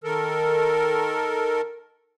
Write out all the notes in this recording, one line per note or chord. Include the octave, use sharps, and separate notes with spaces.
D#3 A4 A#4